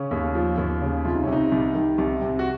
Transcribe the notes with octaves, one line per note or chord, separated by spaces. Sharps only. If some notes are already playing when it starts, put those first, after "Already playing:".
Already playing: C#3 C#4
D#2
F3
D#2
C#3
C2 F4
D#4
C3 C#4
D#4
C2
D#3
C2
C3
F#4